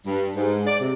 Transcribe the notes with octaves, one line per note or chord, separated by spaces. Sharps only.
G2
G#2
D5
C3